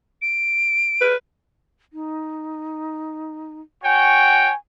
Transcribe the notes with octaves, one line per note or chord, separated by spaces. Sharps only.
D7
B4
D#4
F#4 C#5 G5 G#5